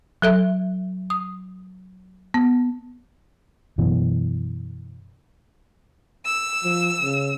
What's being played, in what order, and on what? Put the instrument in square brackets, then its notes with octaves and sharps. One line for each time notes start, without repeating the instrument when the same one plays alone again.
[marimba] F#3 A4 E5
D#6
B3
[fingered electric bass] F#2 B2 E3
[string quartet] E6
[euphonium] F3
C#3